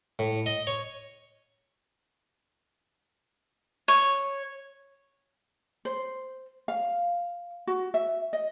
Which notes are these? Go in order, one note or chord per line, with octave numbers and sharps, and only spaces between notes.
A2
D#5
C#5
C#5
C5
F5
F#4
E5
D#5